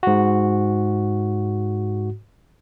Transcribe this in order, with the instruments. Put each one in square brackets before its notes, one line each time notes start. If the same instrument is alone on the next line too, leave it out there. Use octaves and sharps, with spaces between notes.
[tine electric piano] G#2 F#4